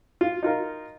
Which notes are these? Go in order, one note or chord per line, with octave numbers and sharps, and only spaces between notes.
F4
D#4 F4 A#4